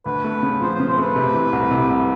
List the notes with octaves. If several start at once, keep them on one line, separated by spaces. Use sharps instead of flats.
D2 B4
A3
C#3
F3 C5
C5
C#3
C5
A3 B4
C3
E3
C2
C3
C2